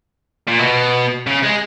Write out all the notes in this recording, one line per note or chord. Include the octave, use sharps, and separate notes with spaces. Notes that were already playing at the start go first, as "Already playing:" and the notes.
A#2
B2
C#3
G#3